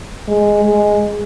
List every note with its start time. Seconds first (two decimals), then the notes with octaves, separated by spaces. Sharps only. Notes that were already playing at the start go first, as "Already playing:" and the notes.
0.28 G#3
0.64 G#3